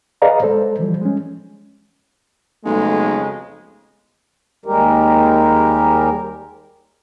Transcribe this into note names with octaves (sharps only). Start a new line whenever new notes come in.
G#4 B4 D5 D#5 F5 A#5
G#3 A4 C5
E3 F3 G3
G#3 C#4
B1 F2 C#3 G#3 A3
D#2 G3 G#3 G4 A#4